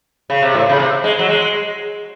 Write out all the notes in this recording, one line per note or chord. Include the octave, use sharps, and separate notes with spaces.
C#3
C3
A2
C#3
C3
G#3
F#3
G#3